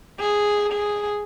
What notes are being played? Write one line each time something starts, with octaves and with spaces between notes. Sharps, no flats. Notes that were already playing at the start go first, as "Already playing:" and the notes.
G#4
G#4